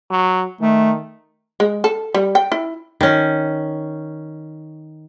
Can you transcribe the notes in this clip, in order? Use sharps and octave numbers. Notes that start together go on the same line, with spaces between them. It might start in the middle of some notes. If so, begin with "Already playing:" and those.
F#3
D#3 A3
G#3
A4
G3
G5
E4
D#3 C#4